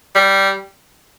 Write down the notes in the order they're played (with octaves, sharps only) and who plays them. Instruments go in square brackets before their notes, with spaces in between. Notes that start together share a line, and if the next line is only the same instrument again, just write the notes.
[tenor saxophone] G3